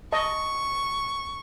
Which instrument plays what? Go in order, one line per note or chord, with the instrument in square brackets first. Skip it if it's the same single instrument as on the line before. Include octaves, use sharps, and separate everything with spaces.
[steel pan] D#5 A5 [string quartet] C#6